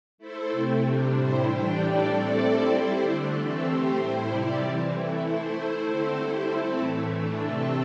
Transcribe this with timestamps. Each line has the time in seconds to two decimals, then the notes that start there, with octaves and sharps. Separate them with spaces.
0.18 A3 E4 A4 C5
0.49 C3 A3 C4
0.81 C3 G3 D4
1.12 A2 G3 E4 C5
1.44 E3 G3 D4 G4
1.75 A2 G3 D4 G4 D5
2.06 A3 C4 A4 D5
2.38 G3 C4 E4 A4 D5
2.69 G3 E4 C5
3.01 D3 A3 D4
3.33 E3 A3 C4 A4
3.64 A3 C4 G4 C5
3.95 A2 G3 E4 C5
4.27 C3 G3 E4 G4 D5
4.57 E3 G3 C4
4.89 E3 A3 E4
5.21 A3 E4 C5
5.52 A3 E4 C5
5.84 D3 A3 C4 A4 C5
6.15 G3 E4 C5
6.46 A3 C4 E4 A4
6.78 A2 E3 A3
7.10 E3 A3 D4
7.40 C3 A3 C4 A4